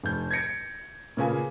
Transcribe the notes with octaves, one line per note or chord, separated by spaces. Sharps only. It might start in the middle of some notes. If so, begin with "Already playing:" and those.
F1 G6
G#6 A#6 C#7 D7
A#2 C#3 B4 G#5